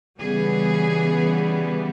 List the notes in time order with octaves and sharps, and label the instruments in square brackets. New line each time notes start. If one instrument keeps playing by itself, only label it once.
[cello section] C#3 E3 G3 B3 G#4